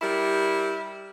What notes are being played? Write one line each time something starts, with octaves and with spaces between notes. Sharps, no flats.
G3 E4 A#4